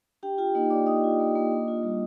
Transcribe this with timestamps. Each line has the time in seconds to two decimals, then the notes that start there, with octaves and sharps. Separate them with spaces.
0.23 D4 G4 G5
0.38 F4 G4 G5
0.55 A#3 D#4 D#5
0.70 A#3 D5 D6
0.86 D4 D#5 D#6
1.04 F4
1.20 A#3
1.35 A#3
1.52 D4
1.68 F4
1.83 G3